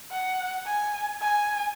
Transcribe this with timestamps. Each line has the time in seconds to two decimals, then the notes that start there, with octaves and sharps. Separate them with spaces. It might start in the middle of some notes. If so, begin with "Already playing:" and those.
0.11 F#5
0.66 G#5
1.22 G#5